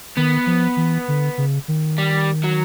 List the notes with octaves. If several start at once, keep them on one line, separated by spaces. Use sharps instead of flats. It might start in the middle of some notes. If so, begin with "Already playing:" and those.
D#3 B3
F3
E3
D3
C#3
D#3
G3
F#3